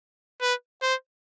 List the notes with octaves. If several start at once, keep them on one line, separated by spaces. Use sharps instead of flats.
B4
C5